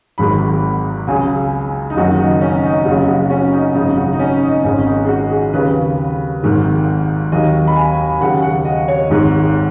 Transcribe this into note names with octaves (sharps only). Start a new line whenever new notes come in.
G#1 G#2 D#3 F#3 B5
C#2 C#3 F#3 G#5
D#4
F#1 F#2 D#3 F#4
D#4
C#4
D#4
F#1 F#2 C#3 F#3 F#4
F#4
C#4
D#4
G#1 F#2 C#3 D#4
F#4
D#4
C#4
D#4
G#1 G#2 D#3 C#4
D#4
G#4
F#4
G#4
D#2 C#3 F#3 B4
G#1 G#2 D#3 F#3
D#2 D#3 F#3 D#5
B5
G#5
D#2 C#3 F#3 F#5
F#5
D#5
C#5
G#1 G#2 D#3